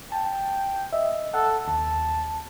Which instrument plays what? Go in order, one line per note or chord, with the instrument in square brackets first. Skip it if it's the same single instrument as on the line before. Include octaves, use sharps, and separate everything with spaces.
[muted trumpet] G5 [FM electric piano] A5
[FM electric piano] D#5 E5
[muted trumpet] A4 [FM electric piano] F#5
[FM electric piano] D#2 [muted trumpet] A5